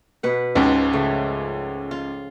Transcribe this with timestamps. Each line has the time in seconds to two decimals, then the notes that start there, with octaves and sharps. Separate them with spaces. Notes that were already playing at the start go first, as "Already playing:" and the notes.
0.23 B2 B4 F#5
0.55 C#2 G#2 F3
0.93 C#3 A3
1.91 F4